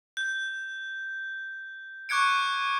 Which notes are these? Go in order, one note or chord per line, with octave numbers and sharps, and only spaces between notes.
G6
C#6 D6 F#6 G#6 C#7 D7